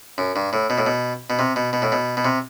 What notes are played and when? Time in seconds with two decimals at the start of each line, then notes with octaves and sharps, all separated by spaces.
0.18 F#2
0.36 G2
0.53 A2
0.70 B2
0.78 A2
0.86 B2
1.30 B2
1.39 C3
1.56 B2
1.73 B2
1.82 A2
1.92 B2
2.17 B2
2.25 C3